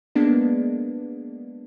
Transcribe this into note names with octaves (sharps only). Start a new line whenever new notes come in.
G#3 A#3 B3 D4